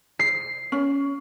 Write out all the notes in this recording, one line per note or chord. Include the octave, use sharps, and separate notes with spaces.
C7
C#4